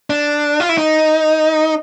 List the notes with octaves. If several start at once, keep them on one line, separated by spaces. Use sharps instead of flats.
D4
F4
E4
D#4